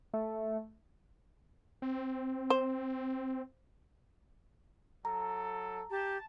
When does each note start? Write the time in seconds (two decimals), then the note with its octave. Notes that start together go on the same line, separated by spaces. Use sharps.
0.13 A3
1.82 C4
2.50 C5
5.05 F#3 A4 A#5
5.90 G4 A5